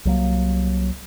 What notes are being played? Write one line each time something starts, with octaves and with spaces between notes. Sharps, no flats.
C2 F#3 A#3